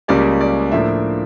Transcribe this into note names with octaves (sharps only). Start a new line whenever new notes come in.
C#2 C#3 G3 A#3 C#4 D5
D5
A2 F3 A#3 D4 E5